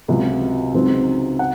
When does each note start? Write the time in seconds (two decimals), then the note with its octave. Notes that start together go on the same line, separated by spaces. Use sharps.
0.08 C#2 C3 F#3
0.74 C#2 C#3 F#3 C4 D#4
1.39 F#5